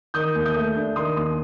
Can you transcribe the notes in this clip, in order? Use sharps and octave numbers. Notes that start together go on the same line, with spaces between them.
D#3 D#6 G6
D#2
D#6 G6
A3
D4
D#3 C6 D#6
D#2 C6 D#6